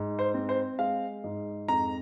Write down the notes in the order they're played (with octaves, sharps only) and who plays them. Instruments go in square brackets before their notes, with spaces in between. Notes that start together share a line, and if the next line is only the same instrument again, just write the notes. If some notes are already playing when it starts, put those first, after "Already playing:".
Already playing: [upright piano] G#2
C5
C4
C5
G#3 F5
G#2
F2 A#5